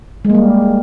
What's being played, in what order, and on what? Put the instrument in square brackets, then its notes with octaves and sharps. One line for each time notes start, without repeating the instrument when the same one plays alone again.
[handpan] G#3
A#3
G3